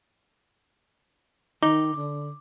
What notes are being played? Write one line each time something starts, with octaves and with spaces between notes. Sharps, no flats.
D#3 D#4 D6
D3